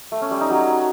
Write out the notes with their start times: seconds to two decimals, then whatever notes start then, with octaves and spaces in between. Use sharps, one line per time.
0.12 A3
0.21 C#4
0.31 G3
0.41 D#4
0.50 F#3